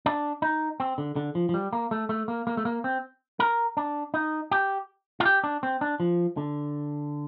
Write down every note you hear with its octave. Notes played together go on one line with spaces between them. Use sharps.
D4
D#4
C4
D3
D3
F3
F3
G3
A#3
A3
A3
A#3
A#3
A3
A#3
C4
A#4
D4
D#4
G4
F4
G4
D4
C4
D4
F3
D3